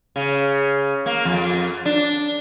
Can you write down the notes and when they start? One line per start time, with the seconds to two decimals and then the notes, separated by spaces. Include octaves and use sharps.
0.16 C#3
1.06 A#3
1.25 F2
1.85 D4